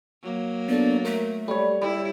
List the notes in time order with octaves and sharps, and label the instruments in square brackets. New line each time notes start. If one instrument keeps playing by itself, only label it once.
[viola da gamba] F#3 A#3
[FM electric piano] B3 D4 A4 [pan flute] D5
[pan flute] A3 [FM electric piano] A#4
[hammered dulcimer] G3 C#5 [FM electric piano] A4
[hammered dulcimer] G3 [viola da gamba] E4